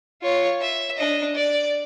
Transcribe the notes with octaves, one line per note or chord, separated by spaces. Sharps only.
F4 C#5
E5
D4 D#5
D5